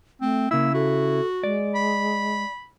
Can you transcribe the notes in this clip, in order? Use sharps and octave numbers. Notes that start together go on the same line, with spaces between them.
A3 C4
C#3 A#3 E4 E6
F#4 A4
G#3 D5
B5